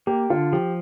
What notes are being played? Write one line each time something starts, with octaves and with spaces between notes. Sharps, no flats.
A#3 G4
D3 F4
F3 G4